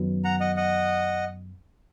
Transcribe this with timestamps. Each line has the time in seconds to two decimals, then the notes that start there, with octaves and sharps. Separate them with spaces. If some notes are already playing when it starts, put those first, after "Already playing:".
Already playing: F#2 D#3 F#3 B3
0.24 F#5 A#5
0.40 D#5 F#5
0.57 D#5 F#5